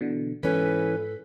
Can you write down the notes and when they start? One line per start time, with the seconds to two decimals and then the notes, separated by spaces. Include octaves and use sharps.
0.01 B2 D3 E3
0.43 G#2 E3 C#4 A4 B4 B6